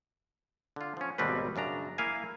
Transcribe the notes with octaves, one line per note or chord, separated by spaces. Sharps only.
D3 F4
F3 C#4
G#1 D#2 B2 G3 C4 B4
F#2 C#3 D4 A#5
A#3 E4 F5 G#5